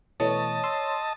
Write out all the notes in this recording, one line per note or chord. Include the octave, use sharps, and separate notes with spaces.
B2 E3 A3 C#5 D#5 A5
C6 E6